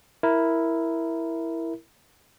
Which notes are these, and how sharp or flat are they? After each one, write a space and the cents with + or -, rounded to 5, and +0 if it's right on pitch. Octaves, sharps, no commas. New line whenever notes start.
E4 +0 A#4 +0